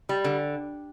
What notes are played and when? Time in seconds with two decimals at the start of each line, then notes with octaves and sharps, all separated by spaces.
0.09 G3
0.24 D3